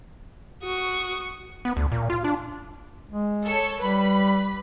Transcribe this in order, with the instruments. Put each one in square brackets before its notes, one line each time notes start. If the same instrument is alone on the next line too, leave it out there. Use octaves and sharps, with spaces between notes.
[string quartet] F#4 C#6 D#6
[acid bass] B3
D2
A#2
F4
D4
[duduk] G#3
[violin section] A4 C#5
[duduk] G3 [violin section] B4 B5